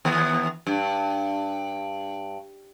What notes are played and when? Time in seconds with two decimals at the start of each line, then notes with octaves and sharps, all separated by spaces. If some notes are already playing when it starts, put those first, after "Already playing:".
0.05 D#2 B3
0.67 G2